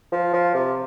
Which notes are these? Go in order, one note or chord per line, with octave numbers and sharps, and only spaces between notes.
F3
F3
C3